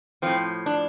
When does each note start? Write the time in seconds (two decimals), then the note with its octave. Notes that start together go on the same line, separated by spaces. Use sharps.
0.22 A2 F3 C4
0.66 D4